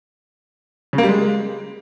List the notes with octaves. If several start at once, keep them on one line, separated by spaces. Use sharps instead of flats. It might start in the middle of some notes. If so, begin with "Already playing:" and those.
C#3
A#3
G3
G#3